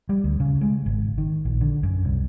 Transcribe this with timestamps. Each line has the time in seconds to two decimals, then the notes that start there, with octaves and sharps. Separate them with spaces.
0.09 G3
0.24 D2
0.40 C#3
0.61 G#3
0.86 G#1
1.18 D#3
1.45 A#1
1.61 D3
1.83 F#2
2.05 C2